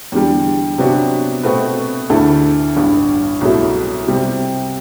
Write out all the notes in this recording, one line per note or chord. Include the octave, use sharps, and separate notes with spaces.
E2 D3 G3
C3 F#3 B3 D4 F#4
B2 A3 C4 F#4 B4
D2 D3 A3 E4 A4
A1 G2 D3
C2 B2 F#3 A3 E4
C3 G3 C4